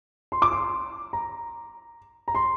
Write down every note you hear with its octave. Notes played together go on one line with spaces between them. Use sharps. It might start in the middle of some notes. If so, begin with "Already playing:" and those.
C6
D6
C6
A#5
A#5
C6